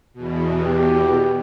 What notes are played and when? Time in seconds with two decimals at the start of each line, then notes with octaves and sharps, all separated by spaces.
0.13 E2 B2
0.64 G4